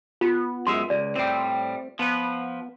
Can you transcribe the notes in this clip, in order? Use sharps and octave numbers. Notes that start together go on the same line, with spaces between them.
B3 F4
F#2 G#3 E5 C6
C#2 D5
A2 G3 C4
F3 B3 B4